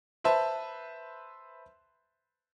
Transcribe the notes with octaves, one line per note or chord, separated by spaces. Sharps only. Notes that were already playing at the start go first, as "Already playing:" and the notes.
B4 C5 E5 A5